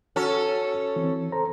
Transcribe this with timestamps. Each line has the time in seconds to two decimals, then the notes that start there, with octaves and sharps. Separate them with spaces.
0.16 C#4 F#4 A4 C#5
0.96 E3 C4
1.32 A4 C5 A#5